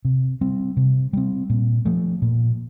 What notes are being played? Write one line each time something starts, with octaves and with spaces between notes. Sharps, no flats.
C3
G3 C4
C3
G3 C4
A#2
F3 A3
A#2